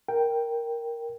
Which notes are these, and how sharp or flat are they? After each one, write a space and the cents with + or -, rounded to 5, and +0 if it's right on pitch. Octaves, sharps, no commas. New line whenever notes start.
A#4 +0 G5 +0